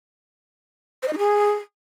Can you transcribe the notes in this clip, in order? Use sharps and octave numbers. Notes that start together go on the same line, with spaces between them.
C5
D#5
D#4
G#4